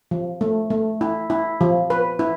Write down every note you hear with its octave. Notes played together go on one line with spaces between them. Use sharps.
F3
A3
A3
E4
E4
F3
B4
E4